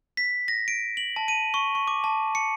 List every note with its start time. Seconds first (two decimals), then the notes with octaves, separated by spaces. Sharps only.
0.17 B6
0.48 A#6
0.68 D7
0.97 F#7
1.16 A5
1.28 D#7
1.54 C#6
1.75 C#6
1.87 D6
2.04 A5
2.35 C#7